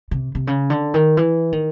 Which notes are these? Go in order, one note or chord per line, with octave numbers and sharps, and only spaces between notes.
C3
C3
C#3
D3
D#3
E3
D#3